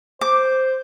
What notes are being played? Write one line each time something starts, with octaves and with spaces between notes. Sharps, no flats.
C5 D6